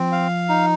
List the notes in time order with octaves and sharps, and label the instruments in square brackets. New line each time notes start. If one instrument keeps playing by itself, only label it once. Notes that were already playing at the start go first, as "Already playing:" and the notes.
Already playing: [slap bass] F3 [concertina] C4
[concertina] F5
D#4